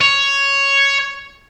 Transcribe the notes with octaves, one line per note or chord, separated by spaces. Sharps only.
C#5